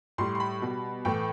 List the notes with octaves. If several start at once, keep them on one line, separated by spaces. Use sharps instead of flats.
A2 G3 C6
C6
B5
B2 G3
A2 E3 A3 G5